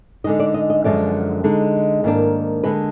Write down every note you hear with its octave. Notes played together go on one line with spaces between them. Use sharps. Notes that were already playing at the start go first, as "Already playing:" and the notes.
D3 G#3 D#4 D#5
D5
D#5
D#5
F#2 D3 F3 G#3 D5
D3 G#3 D#4
G#2 D#3 A#3 D4
D3 G#3 B4